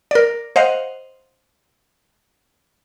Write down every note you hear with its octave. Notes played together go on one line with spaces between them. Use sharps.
A#4 D5
C5 D#5 F5 F#5